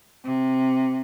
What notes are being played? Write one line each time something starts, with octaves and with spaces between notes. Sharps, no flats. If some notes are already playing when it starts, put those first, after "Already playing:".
C3